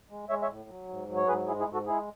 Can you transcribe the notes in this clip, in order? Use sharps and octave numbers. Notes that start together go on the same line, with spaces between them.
G#3
G#3 C#5 E5
C#5 E5
A2
F#3
G#2
F#3
C#5
G#2 G#4 B4
G#3 E4 G#4
E4 G#4
G#2
F#4 A4
G#3 E4 G#4